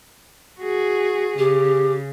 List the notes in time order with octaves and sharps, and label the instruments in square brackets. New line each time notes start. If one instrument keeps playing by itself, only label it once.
[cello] F#4 G#4
[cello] C#3 [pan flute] G4